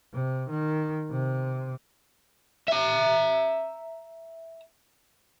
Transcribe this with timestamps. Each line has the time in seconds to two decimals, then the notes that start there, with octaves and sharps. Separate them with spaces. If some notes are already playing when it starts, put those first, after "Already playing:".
0.13 C3
0.50 D#3
1.11 C3
2.68 E5 A#5